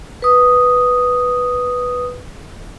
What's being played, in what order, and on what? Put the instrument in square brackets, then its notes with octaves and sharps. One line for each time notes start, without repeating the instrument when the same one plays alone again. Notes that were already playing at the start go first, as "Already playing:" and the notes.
[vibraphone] B4 D#6